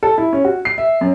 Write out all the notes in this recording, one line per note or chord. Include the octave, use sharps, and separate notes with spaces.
A4
E4
C#4
F#4
C7
E5
F#2